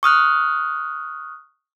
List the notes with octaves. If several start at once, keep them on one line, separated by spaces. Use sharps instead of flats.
C#6 D#6 F6 F#6